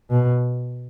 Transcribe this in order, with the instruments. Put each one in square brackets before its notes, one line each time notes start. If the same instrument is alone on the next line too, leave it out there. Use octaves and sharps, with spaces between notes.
[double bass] B2